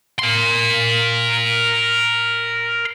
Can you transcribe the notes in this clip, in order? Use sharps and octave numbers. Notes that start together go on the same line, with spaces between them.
A#4 C6